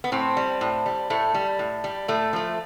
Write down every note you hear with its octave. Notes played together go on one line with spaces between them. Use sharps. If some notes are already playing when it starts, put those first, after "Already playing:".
B3
A2 C4
G3
A2
G3
A2 A3
G3
A2
G3
A2 A3
F3 A3